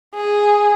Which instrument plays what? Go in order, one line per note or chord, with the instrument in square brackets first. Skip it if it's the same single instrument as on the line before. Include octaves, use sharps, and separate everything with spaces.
[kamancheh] G#4